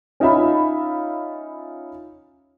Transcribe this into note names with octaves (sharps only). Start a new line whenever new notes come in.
C#4 D#4 F4 E5 F5 B5